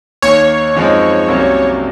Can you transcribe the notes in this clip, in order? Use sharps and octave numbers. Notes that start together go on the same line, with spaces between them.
D#2 D#3 A#3 C#5
F#2 F3 G#3 C4 D#4
C2 C3 F#3 A#3 C#4